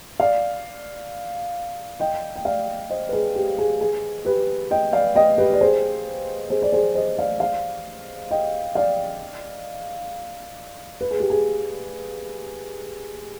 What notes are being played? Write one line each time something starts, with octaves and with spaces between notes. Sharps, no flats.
D5 F5
D#5 G5
G5
D5 F5
C5 D#5
B4
G#4
G4
G#4
G#4
G4 B4
D#5 G5
D5 F5
D#5 G5
G4 B4
D5
G#4 C5
G#4 C5
D5
G#4 C5
C5 D#5
D5 F5
D5 F5
D#5 G5
D5 F5
B4
G#4
G4
G#4